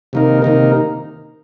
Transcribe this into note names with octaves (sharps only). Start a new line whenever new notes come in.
C3 D#3 A#3 D#4 A#4
C3 D#3 A#3 D#4 A#4